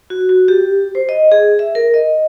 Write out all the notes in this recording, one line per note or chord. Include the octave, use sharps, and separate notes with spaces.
F#4
F#4
G4
C5
D#5
G#4
E5
A#4
D#5